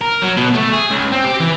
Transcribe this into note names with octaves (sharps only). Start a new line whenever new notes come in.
A#4
F#3
B2
A3
G#4
C#2
C4
G4
E3